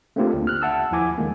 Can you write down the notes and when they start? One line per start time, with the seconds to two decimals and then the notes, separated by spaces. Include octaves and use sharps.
0.16 A3 A#3 C4 D4 F4 G4
0.34 D2
0.46 G#1 F6 F#6
0.62 E5 F#5 A5 E6
0.91 D#2 F3 E4 G#5 D6
1.18 D#3 G#3 A#3